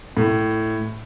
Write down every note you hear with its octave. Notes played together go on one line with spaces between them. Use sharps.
A2